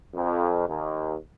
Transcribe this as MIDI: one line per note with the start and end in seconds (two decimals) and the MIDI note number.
0.14 0.63 41
0.67 1.15 39